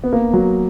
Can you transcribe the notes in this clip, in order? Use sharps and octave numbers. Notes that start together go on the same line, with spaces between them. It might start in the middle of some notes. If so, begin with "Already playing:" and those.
B3
A#3
F#3